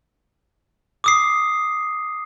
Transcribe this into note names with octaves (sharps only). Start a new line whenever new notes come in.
D6 D#6 C7